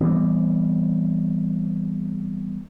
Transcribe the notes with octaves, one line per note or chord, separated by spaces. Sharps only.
E3 G3 B3 C4